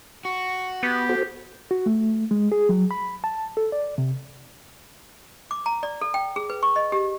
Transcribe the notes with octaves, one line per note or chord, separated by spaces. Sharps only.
F#4 C#6
B3 G4
F#4 A4 C5
F#4
A3
G#3
G#4
F#3
B5
A5
A4
D5
C3
D6
A#5
D5
A4
G5
G#4
B4
C#6
D#5
G4